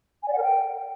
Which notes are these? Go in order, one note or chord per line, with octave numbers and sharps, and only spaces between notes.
G#5
D5
F#5
A#4
G5